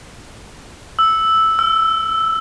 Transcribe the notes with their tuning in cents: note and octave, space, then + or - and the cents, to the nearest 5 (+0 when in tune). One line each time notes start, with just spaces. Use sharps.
E6 -5
E6 +40